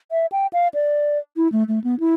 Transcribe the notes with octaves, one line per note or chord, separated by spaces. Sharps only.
E5
G5
F5
D5
E4
A3
A3
B3
E4